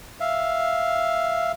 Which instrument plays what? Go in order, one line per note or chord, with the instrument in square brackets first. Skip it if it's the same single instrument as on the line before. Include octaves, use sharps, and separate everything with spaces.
[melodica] E5 F5